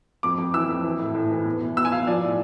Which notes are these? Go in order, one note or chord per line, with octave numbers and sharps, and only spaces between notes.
F2 D6
F2
E3 E6
F2
E3
A2
A2
E3
E2
B2
B2 E6
G#5
B2 F5
F3 D5
A2